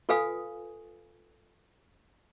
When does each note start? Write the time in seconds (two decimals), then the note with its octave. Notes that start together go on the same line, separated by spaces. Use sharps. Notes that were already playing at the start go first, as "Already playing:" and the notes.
0.09 F4 A4 B4 F5 G#5 D#6